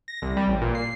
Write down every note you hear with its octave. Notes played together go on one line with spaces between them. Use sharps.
A#6
C2
G3
A1
A#2
C7